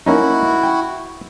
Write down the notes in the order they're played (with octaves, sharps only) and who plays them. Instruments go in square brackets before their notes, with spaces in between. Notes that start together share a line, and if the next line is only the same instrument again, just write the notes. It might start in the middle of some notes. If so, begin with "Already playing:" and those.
[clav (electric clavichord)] A#3 C#4 D#4 [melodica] E4 F#4
[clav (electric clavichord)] G5